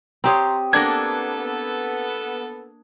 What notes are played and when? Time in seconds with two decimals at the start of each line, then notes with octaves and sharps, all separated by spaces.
0.24 C4 G4 C#5 A#5 C6 D#6
0.73 A#3 B3 D4 A4 G#6 A#6